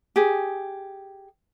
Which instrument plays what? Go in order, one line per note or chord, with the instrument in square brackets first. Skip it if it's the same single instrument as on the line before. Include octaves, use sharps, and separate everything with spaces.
[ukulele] G4 G#4